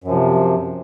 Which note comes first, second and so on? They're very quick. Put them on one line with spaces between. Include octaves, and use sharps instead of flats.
F#2 F3 C3